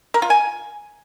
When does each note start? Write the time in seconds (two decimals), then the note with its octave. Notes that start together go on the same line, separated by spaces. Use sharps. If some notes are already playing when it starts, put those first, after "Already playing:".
0.14 A#4
0.22 F4
0.30 G#5